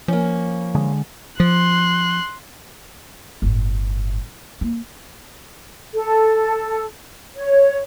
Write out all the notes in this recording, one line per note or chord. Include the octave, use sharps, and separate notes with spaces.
F3 A#3 C#4
D3 G#3
F3 C6 F#6
G1 A2
A#3
A4
C#5